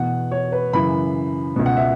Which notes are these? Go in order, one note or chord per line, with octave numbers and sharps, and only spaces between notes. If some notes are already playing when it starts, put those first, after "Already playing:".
Already playing: E2 B2 F#5
C#5
B4
F#2 C#3 E3 B5
C#2 B2
F#5
E5